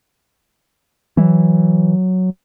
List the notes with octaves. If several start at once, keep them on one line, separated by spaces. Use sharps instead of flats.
E3 F#3